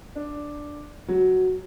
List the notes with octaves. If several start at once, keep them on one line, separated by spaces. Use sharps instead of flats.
D4
F#3